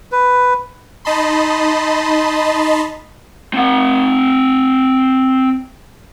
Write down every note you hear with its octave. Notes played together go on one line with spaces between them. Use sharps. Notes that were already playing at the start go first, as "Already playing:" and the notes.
B4
D#4 D#5 A5 B5 C6
C4 F#5